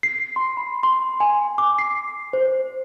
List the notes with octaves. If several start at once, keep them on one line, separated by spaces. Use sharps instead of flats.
C7
C6
B5
C6
G#5
D6
C7
C5